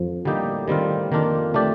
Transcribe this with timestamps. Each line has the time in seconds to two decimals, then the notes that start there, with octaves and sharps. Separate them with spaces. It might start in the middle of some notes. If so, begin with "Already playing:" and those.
Already playing: F2 F3
0.25 A2 D3 G3 A3 A#3 D#4 G4
0.68 D#3 G3 C4 F4
1.11 F2 D#3 F3 A#3 D4 F4
1.54 A3 D4 G4 D5